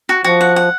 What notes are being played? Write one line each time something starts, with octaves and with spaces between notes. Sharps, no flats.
F#4
F3 F#4
F#5
F#5